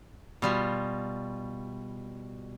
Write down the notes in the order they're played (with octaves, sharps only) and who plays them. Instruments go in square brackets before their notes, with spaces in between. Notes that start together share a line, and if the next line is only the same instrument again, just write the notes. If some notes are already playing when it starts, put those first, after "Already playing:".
[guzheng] B2 G3 F4